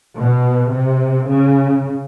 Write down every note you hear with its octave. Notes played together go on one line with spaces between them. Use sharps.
B2
C3
C#3